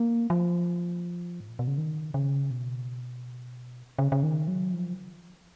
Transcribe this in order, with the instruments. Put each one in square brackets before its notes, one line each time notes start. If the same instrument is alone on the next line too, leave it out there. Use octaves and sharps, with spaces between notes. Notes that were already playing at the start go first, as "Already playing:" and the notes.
Already playing: [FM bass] A#3
F3
G#2
A#2
B2
C#3
D#3
C#3
B2
C#3
C#3
D#3
F#3
F3